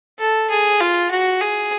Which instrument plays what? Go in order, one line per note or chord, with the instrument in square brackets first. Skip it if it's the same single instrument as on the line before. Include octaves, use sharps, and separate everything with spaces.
[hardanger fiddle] A4
G#4
F4
F#4
G#4